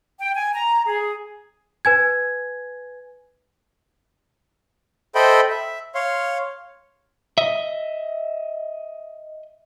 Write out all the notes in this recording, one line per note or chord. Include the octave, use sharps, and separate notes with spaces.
G5
G#5
A#5
G#4
B4 G#5 G#6
A4 C5 D#5 E5 G5 B5
E5
C#5 F5 C6
D#5 E5